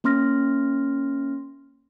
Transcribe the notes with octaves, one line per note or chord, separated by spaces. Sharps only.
A#3 C#4 C6 F6 A#6